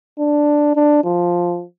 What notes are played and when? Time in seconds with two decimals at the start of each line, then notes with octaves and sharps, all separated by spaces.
0.19 D4
0.75 D4
1.04 F3